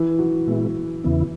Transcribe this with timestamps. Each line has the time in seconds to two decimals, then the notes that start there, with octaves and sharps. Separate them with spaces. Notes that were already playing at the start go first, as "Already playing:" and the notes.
Already playing: E3 E4
0.19 F#3 F#4
0.47 A#2 G#3 B3 E4
1.04 E2 C#3 E3 B3 E4